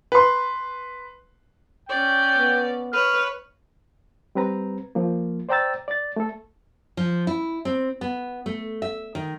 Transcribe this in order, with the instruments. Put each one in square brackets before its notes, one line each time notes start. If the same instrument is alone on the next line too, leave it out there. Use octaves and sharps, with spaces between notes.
[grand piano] B4 C6
[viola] C#4 D5 [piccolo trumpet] G5
[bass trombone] B3
[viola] B4 C#5 [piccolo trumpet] F6
[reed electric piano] G3 C4 B4 A#5
F3 A#3
C5 D5 G5 A#5 E6 A6
D5 A6
A3 A4
[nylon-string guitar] F3
E4
C4
B3
A3
E5
D#3